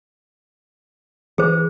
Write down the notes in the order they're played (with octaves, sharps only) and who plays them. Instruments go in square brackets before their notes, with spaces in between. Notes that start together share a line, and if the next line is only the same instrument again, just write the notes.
[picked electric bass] E3 [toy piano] G#4 C5